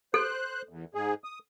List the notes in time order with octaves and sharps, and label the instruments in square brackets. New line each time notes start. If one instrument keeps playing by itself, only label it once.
[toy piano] A4 [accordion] C5 F#6
[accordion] E2
G#2 G#4
D#6